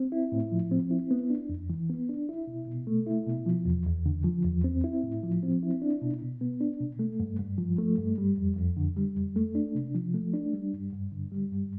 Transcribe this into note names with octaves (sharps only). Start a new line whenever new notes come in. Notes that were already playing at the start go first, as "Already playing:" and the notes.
Already playing: C4
E4
A2
F3
C4
E4
B3
D4
F2
E3
B3
D4
E4
B2
B2
A3
E4
B2
F3
E2
E2
D3
F3
E2
C4
E4
A2
F3
C4
E4
D4
B2
B2
B3
D4
B2
A3
G2
G2
F3
A3
G2
G3
F2
F2
D3
G3
F2
A3
D4
C3
F3
A3
D4
G3
G2
G2
D3
G3
G2